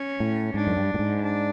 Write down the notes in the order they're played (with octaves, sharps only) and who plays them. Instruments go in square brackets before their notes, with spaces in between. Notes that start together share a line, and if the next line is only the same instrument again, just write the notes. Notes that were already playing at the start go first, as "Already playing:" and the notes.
Already playing: [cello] C#4
[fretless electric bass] A2
[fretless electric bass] G#2 [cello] D4
[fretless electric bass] F#2
G2
A2
G#2
[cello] D4